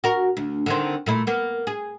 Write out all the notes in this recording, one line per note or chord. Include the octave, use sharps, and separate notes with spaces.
F#4 A#4
D2
D3 D#3 C4
A#2 A3 E4
A#3 B3
G#4